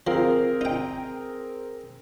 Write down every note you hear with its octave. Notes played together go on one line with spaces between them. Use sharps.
F3 C4 G#4 A#4
D#4 G5